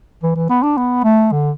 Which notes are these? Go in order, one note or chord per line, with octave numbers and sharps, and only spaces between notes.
E3
E3
B3
D4
B3
A3
D3